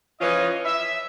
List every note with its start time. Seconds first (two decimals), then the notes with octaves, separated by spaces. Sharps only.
0.21 E3 F3 C#4 F4 D#5
0.65 E5